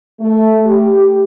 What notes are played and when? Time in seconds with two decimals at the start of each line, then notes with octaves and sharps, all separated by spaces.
0.20 A3
0.65 G4